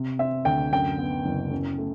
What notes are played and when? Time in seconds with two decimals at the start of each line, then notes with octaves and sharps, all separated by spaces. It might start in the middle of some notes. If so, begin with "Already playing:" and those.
Already playing: C3
0.19 C4 E5
0.45 D2 G5
0.72 F#2 G5
0.98 B3
1.25 F#1
1.51 F#2
1.78 A3